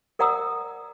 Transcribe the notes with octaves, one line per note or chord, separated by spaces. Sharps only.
A#4 D5 F#5 A#5 D#6 E6